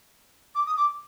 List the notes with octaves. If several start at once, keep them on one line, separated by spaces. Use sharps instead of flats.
D6
D#6
D6